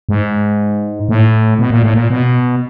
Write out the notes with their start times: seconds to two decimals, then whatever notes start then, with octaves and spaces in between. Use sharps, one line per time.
0.09 G#2
1.09 A2
1.59 B2
1.71 A#2
1.83 A2
1.94 A#2
2.10 B2